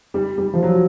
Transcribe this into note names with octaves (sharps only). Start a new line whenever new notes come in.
G3
G3
F3
F#3